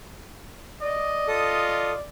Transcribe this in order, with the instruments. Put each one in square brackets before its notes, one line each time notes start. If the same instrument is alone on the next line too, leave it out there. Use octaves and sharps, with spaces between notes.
[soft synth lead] D5 [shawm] D#5
[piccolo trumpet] F4 [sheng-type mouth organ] A4 D#6